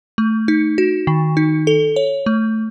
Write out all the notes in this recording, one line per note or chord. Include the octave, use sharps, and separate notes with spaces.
A3
D#4
F#4
D#3
D#4
A4
C#5
A3